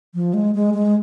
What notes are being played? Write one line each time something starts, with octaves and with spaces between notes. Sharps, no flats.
F3
G#3
G#3
G#3